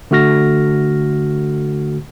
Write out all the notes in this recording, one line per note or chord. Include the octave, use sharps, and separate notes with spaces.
D3 A3 F#4 F6 A#6